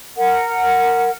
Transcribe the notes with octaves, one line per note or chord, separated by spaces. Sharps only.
A#4 F#5